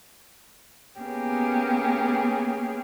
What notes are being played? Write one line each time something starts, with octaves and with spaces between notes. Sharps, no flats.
A#3 B3 C#4 G4 G#4